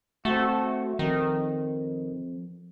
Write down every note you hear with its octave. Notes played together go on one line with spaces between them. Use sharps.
A3 C4 F#4
F2 D#3